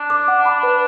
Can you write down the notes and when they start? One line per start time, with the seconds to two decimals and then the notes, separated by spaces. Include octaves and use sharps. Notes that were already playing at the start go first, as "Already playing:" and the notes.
Already playing: D4
0.10 D6
0.28 F#5
0.45 B5
0.63 B4